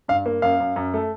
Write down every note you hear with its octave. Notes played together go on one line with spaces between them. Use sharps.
G2 F5
A#3
F#2 F5
F#2
F#2
A3